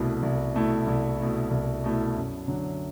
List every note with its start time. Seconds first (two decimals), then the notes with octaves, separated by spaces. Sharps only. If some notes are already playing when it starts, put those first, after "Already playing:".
Already playing: C2 B2 A3 E4
0.23 C2
0.54 B2 A3 E4
0.87 C2
1.19 B2 A3 E4
1.51 C2
1.84 B2 A3 E4
2.16 F#2
2.47 D3 F#3